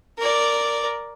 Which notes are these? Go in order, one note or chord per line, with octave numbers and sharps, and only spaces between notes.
A#4 D5